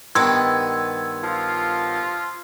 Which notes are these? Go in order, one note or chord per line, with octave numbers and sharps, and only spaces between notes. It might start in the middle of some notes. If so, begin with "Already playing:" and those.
G2 D#3 B3 C6 E6 G#6
F3 F4